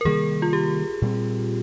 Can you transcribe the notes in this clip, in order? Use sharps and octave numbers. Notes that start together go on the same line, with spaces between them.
A#4
C3 D#3 G3 A#3 G#4
F4
G4
A#2 G3 C4